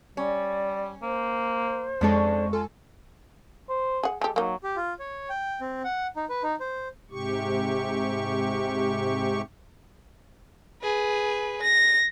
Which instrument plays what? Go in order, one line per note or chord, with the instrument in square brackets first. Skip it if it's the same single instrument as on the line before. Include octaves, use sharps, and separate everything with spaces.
[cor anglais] G3 [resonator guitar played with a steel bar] C#4 [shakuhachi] D5
[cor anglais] A#3 [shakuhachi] C5
[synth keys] F2 G#3 C#6 [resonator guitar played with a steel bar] C#4 D4 A4
[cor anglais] F4 [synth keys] A4 [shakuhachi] G#5
[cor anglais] C5
[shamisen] G#4 F#5
[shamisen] G#3 G4 [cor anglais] A4
[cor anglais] F#3 [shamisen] A#3 D#4
[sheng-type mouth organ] G4
F4
C#5
G5
C4
F#5
D#4
B4
D#4
C5
[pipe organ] G#2 C3 G4 C#6
[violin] G#4 B4
A#6